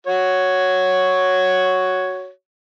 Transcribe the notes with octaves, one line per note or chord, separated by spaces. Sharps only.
F#4 C#5